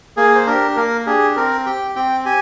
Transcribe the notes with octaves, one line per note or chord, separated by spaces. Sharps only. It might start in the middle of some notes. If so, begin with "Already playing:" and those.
A#3 G#4
C5
D4 G4 A#4
A#3 A#4
D4 G4 G#4
C4 A#4
G4 G5
C4 G5
G4 G#5